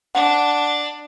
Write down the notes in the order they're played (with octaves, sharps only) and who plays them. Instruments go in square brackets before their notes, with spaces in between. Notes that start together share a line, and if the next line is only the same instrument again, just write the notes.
[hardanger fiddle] D4 [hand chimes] F#5